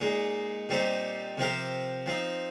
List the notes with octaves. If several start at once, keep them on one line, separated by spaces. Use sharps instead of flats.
A#2 G#3 D#4
A#2 G3 C4 D#4 G4
C3 F3 C4 G4 A#4
F3 C4 D#4